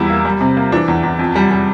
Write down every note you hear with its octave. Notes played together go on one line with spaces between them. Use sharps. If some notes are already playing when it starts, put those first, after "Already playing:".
Already playing: E2 G3 E4
A#3
G3
C3
A#3
E3 D4
E2
E2
F2
G3
G3